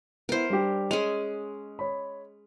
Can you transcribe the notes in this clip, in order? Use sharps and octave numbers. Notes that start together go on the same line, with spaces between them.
B3 E4 A#4 C5
G3 D4 G4
G#3 C#4 G#4 F7
C#5 B5